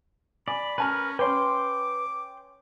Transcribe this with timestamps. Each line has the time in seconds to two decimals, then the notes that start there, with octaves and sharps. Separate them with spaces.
0.48 D5 G#5 B5
0.78 C#4 A#4 B4 G#5 A5 F6
1.19 C#4 B4 C#5 G5 G#5 C6 D6